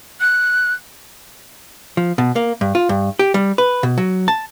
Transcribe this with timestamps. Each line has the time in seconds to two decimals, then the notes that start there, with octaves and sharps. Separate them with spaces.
0.21 F#6
1.97 F3
2.18 B2
2.36 A#3
2.61 G2
2.75 F4
2.89 G2
3.19 G4
3.34 G3
3.58 B4
3.83 B2
3.98 F#3
4.28 A5